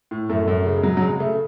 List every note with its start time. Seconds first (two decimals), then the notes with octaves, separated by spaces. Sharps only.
0.11 A2
0.29 F#2 A3
0.48 F#2
0.66 C#3
0.77 G#3
0.83 C#3 F#3
0.97 F#3
1.02 C#3 G#3
1.20 C#3 A3